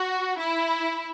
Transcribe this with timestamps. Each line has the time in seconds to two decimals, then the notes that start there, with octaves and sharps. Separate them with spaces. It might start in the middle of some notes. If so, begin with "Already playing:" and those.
Already playing: F#4
0.38 E4